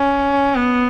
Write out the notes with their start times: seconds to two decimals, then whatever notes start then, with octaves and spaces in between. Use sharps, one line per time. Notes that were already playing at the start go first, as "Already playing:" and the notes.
Already playing: C#4
0.55 B3